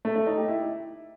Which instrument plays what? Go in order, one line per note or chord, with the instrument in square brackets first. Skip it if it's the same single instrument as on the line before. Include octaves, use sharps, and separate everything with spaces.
[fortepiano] A3
A3
D#4
G4
E4